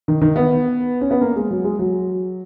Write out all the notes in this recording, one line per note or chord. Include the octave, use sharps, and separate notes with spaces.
D#3
D#3
B3
C#4
B3
A#3
G#3
F#3
G#3
F#3